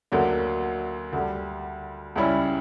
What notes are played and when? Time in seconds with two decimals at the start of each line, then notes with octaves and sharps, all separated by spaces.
0.12 D2 D3 F#3 A#3
1.13 D2 D3 G3
2.16 C#2 C#3 G3 C#4 E4